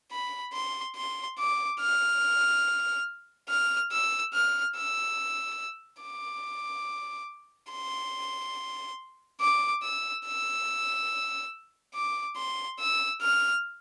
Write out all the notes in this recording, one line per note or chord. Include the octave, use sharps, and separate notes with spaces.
B5
C6
C6
D6
F6
F6
E6
F6
E6
D6
C6
D6
E6
E6
D6
C6
E6
F6